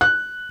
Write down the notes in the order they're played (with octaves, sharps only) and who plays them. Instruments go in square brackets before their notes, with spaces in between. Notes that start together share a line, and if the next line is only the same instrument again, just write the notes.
[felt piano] F#6